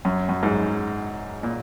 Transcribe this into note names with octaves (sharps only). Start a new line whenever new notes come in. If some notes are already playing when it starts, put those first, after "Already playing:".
F#2
F#2
G#2
A#2